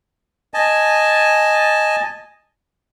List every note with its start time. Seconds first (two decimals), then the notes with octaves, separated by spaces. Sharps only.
0.54 D#5 G#5 A5